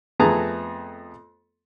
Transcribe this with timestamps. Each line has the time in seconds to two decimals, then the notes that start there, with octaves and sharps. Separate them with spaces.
0.19 F2 A3 B3 G#4 A5 A#5